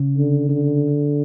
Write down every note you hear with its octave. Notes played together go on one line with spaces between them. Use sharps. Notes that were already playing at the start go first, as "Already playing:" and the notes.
Already playing: C#3
D3
D3